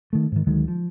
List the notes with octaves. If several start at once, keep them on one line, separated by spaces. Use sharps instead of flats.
D#3 A3
G#2 D#3
D2 D#3 F#3 G#3
F3